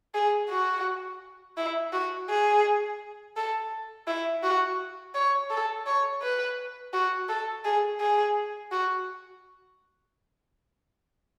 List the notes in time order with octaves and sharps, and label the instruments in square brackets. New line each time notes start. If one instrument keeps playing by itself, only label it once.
[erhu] G#4
F#4
E4
F#4
G#4
A4
E4
F#4
C#5
A4
C#5
B4
F#4
A4
G#4
G#4
F#4